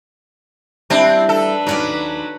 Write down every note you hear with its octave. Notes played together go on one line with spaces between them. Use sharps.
G3 C4 D4 E4
D4 A4 B4
D#2 F#3 C#4 D5